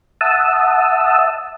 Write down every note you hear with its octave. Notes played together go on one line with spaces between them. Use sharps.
E5 F#5 A5 D#6 E6